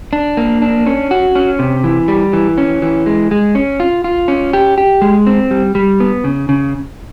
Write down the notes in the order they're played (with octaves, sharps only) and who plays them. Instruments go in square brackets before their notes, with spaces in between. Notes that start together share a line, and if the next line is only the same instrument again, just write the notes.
[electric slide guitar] D4
A#3
D4
C#4
F#4
C#4
C3
E3
G3
E3
C#4
E3
G#3
G#3
C#4
F4
F4
C#4
G4
G4
G#3
C4
G3
G3
B3
C#3
C#3